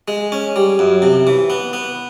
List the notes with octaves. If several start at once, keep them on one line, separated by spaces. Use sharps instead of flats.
G#3
C#4
G3
F#2
C3
E3
B3
B3